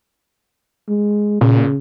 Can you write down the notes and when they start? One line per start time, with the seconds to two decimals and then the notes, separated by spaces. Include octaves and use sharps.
0.89 G#3
1.41 A#2 C#3